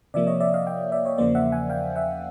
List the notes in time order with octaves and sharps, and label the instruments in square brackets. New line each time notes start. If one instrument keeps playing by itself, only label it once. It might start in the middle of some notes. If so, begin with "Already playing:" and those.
[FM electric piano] C3 F3 A#3 D5 E5
C#5 D#5
D5 E5
D#5 F5
F5 G5
D5 E5
C#5 D#5
E2 C#3 F3 A#3 C5 D5
E5 F#5
F#5 G#5
F5 G5
E5 F#5